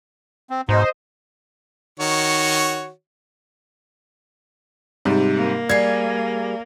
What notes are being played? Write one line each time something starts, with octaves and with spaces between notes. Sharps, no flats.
C4
G#2 B2 D#4 C5 D#5
D#3 F#4 C#5
G#2 C3 G3
A#3
G3 G#4 G#6 C7